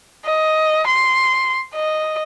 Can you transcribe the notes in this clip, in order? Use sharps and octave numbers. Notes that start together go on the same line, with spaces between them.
D#5
C6
D#5